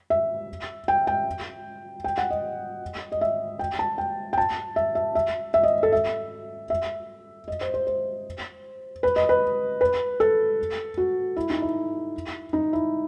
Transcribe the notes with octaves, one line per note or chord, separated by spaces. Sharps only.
E5
G5
G5
G5
F#5
D#5
D#5
E5
G5
A5
G5
G5
A5
E5
E5
E5
E5
D#5
A4
E5
E5
D#5
C5
C5
C5
B4
D#5
B4
B4
A4
F#4
E4
D#4
E4
D#4
E4